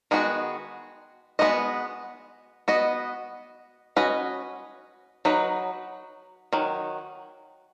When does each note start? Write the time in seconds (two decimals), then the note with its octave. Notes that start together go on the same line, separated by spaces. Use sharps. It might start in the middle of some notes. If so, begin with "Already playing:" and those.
0.11 D#3 G#3 B3 F#4
1.39 G#3 B3 D#4 F#4 D#5
2.68 B3 F#4 D#5
3.96 C#4 F#4 B4 D#5
5.25 F#3 D#4 B4
6.53 D#3 F#3